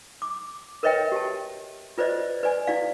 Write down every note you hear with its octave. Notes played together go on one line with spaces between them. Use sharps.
D6
A#4 B4 C#5 D#5 E5 G5
G4 A5
F4 B4 C5 D5 D#5
B4 D5 G#5
E4 D5 F5